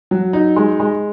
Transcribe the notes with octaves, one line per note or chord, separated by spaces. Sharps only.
F#3
D#4
G#3
G#3